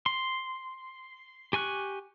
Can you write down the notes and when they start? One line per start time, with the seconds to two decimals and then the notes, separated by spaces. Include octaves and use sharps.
0.06 C6
1.53 G4 G#5 C#6 F#6